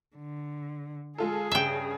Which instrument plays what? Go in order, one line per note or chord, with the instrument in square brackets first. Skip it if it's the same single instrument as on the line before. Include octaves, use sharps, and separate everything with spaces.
[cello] D3
[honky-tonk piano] G#3 F4 A4 [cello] G#4
[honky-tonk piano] G2 C#3 [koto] E5 G5